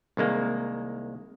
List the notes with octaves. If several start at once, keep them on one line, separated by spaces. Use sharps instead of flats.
C2 D#3 G#3 A#3